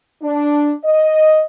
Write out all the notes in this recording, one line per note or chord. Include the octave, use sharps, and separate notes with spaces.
D4
D#5